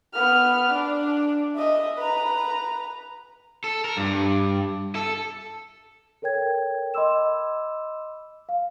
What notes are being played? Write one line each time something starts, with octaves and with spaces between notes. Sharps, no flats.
B3 F6
D4
D#5 E5
B4 A#5
A4
A#4
G2
A4
A4 A#4 C#5 G5 G#6
D#5 B5 C6 D6 E6 E7
F5